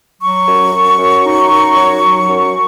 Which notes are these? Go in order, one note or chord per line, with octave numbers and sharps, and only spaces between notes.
F#3 C#6
F#2
F#2
F#2
D#4
F#2
F#3
F#3
F#2